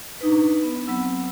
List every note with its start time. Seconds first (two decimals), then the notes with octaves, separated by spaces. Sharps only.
0.21 D4 D#4 B4
0.63 B3
0.87 F#3 B3 C4 F#5 E6